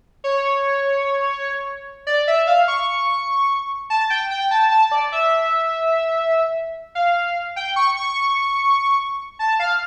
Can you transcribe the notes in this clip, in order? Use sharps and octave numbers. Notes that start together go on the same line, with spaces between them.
C#5
D5
E5
F5
C#6
A5
G5
G5
A5
A5
D5
E5
F5
G5
C#6
C#6
A5
F5